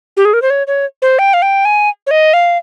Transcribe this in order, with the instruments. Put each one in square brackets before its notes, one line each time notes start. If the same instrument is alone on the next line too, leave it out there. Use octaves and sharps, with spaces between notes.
[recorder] G4
G#4
A#4
C5
C#5
C#5
C5
G5
F5
G5
G#5
C#5
D#5
F5